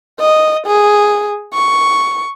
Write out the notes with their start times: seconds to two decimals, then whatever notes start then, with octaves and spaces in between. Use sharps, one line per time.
0.20 D#5
0.67 G#4
1.54 C#6